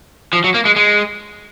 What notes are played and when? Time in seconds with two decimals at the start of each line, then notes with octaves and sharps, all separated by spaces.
0.33 F3
0.44 F#3
0.54 A#3
0.65 G#3
0.76 G#3